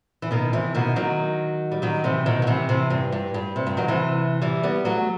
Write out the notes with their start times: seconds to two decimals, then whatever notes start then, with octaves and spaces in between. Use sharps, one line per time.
0.22 E3
0.31 B2 D#3
0.53 C3 E3
0.74 B2 D#3
0.96 D#3 F#3
1.71 G3
1.82 D#3 F#3
2.04 C3 E3
2.26 B2 D#3
2.42 F#3
2.47 C3 E3
2.69 C3 E3
2.90 G2
3.12 G2
3.34 G2
3.56 C3
3.67 G2
3.77 D#3 F#3
3.88 C3 E3
4.41 E3 G3
4.63 G3 B3
4.85 F#3 A3